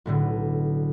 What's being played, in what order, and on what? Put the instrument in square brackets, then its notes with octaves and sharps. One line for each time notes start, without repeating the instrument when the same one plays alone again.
[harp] B1 A2 D3